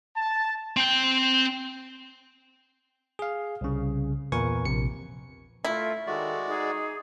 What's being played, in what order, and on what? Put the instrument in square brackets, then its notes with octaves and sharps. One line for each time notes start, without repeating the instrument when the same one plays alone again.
[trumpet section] A5
[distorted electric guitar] C4 G5
[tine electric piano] G#4 F5
C2 C#3
E2 A#2 A#4 B4 G#5 C#6
A#1 C3 C#7
[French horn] A3 [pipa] E4 [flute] F4
[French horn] D#3 [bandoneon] G#3 F#4 D5 [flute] A4
[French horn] D#4 [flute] G#4